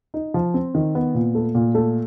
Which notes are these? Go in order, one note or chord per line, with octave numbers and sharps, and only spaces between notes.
D#4
F3
C4
D#3
B3
A#2
A3
A#2
A3